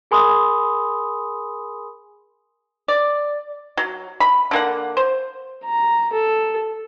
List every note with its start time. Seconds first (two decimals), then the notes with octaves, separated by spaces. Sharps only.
0.11 G#4 A#4 G#5 B5 C6 D#6
2.88 D5
3.77 F#3
4.20 B5
4.51 D3 A#3 F#5
4.97 C5
5.65 A#5
6.13 A4